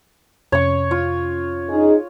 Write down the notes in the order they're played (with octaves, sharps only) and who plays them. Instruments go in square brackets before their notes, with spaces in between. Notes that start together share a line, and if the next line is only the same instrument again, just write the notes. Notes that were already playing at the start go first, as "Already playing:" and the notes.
[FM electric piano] F2 C3 C#4 [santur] C#5 C#6
[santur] F4
[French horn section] D#4 G#4